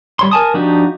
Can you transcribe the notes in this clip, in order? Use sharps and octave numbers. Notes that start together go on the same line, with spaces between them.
G3 C#5 C6
A#4 G#5 A5 D#6
F3 D4 D#4 F#4 G4